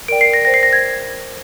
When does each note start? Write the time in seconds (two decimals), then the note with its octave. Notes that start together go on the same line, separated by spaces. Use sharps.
0.08 A#4 D5 G5 D7
0.21 C7
0.33 A#6
0.45 C5 G5 A#6
0.54 C7
0.63 A#6
0.73 G#6